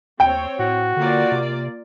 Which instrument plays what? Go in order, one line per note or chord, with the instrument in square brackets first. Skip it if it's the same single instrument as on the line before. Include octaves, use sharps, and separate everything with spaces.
[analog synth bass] D#2 [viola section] C4 C#5 [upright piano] G5
[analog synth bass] A2 [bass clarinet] F#4
[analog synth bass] D3 [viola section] A#3 F4 D5
[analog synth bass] C3